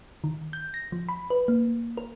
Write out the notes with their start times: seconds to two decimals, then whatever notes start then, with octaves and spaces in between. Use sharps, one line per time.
0.24 D#3
0.53 G6
0.74 A#6
0.92 F3
1.09 B5
1.30 B4
1.48 A#3
1.97 A#4